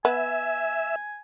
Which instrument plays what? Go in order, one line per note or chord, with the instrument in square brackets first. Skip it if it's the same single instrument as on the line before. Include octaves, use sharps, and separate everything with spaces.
[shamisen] B3 [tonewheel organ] E5 [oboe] G#5